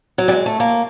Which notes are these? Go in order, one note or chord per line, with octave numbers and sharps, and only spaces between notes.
F#3
G3
G#3
A3
A#3